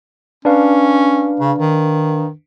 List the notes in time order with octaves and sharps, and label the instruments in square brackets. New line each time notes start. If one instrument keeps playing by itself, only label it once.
[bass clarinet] C#4 [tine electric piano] D4 B4 F5
[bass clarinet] C#3
D#3